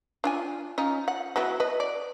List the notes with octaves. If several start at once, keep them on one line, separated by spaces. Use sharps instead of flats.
D4 F4 G#5
C#4 D#4 F4
F#5
F#3 B3 E4
B4 D#5
D5